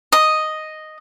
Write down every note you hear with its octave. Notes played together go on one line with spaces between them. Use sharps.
D#5